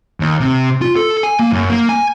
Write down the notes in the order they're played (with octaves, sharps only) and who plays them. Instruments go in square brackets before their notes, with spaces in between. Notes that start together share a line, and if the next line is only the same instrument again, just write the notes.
[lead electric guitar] D#2
C3
F4
A4
G#5
A#3
F#2
A#3
G#5